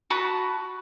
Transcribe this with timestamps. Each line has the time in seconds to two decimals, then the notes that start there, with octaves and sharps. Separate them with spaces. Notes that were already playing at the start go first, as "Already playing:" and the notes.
0.10 F#4 A5 B5 D#6